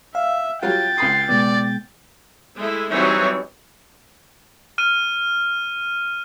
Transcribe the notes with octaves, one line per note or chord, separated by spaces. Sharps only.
E5 F5
F#3 G3 F4 F#5 G5 A6
C#2 B5 C6 D#6
B2 G#3 B3 D5
G#3 A3 E4
E3 F#3 G3 C4 D#4 C#5
F6 D#7